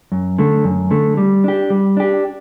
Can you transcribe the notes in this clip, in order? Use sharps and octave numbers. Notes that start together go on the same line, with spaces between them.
F#2
D3 A3
F#2
D3 A3
G3
D4 G4
G3
D4 G4